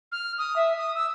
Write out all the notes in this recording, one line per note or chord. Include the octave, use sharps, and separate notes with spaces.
F6
D#6
E5
D#6
E6